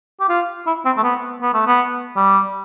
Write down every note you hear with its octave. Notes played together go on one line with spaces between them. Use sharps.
G4
F4
E4
C4
A3
B3
B3
A3
B3
G3